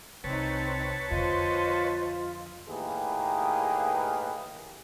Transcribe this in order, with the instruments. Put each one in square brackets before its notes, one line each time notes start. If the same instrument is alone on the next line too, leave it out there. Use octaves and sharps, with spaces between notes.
[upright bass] C2 [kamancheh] C4 D#4 [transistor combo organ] B4 C#5 A5
[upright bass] F2 D3 [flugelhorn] F4 [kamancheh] C5 D#5
[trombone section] A2 D#3 A#3 G4 G#4 B4